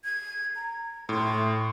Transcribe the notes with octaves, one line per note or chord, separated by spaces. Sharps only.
G#6
A#5
A2 C6